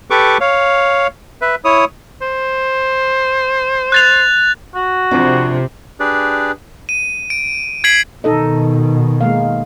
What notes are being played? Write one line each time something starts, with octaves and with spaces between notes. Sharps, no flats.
G4 A4 B4 C#6 D6
C#5 F5
B4 E5
E4 C#5 D#6
C5
F#6 A6 F7
F#4
F2 C3 D4
D4 G4 G#4 B4 D5
D#7
D7
G#6 B6 C7 D7 F#7
B2 D#3 D#4 A4 D#5
G#3 A#3 F5